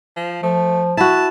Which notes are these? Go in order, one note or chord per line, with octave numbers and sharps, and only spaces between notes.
F3
F3 A3
E4 F#4 A5